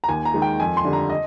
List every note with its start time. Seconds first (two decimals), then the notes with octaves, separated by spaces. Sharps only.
0.04 A#5
0.08 D#2 G#5
0.25 A#5
0.34 D#3 G#3
0.42 G5
0.60 F2 G#5
0.77 C6
0.85 D3 G3
0.93 A#5
1.10 D#5